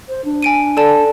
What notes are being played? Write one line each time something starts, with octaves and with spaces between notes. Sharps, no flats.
C5
D4
G#5 D7 D#7
A4 D5 A5